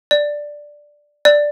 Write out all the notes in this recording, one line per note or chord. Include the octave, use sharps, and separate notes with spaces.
D5
D5